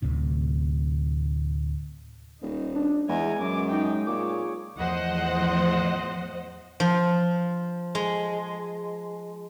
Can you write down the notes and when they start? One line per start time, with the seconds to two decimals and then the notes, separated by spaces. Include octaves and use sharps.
0.02 D2 A2 C3
2.41 D#1 D#4
2.75 D4
3.09 E2 G#3 G#5 A#5
3.39 F#2 D6
3.71 D#4 G5
4.07 A#2 G#4 C#5 D6
4.77 E2 A2 F3 C5 D#5 F#5
6.80 F3
7.95 G#3